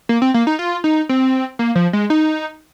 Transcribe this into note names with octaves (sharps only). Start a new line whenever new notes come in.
A#3
C4
A#3
D#4
F4
D#4
C4
A#3
F3
G#3
D#4